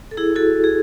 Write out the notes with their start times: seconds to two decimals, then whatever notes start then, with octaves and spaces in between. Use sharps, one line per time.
0.11 A4
0.17 E4 G#4
0.36 F#4 A4
0.64 G#4